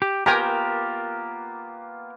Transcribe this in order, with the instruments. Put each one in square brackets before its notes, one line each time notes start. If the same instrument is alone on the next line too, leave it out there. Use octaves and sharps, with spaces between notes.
[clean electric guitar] G4
[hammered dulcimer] A#3 B3 F4 [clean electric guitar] G4 A#4 [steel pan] G5 G#5 A#5